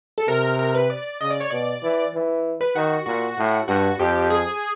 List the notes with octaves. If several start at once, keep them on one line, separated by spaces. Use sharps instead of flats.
A4
C3 A#4
A#4
B4
D5
C#3 D#5
D5
C#5
B2 D5
E3
E3
B4
D#3 F#4
A#2 F#4
A2
G2 F#4
F2 G4
G#4